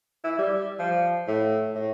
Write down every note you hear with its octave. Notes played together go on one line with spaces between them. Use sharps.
E4
G3
F3
A2
A2